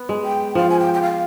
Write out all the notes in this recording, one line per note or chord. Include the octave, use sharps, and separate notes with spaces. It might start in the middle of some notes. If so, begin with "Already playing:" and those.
Already playing: B3
G#3
G5
F3 F5
G#5
G5
G5
F5